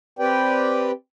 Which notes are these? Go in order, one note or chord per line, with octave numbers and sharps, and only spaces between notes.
C4 G4 B4 D5 G5